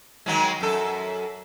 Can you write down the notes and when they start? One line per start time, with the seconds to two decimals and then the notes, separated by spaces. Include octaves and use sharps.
0.26 D#3 F#3 G#3
0.61 F#2 A4